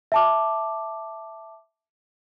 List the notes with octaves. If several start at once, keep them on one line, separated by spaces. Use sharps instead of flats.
E5 A5 D6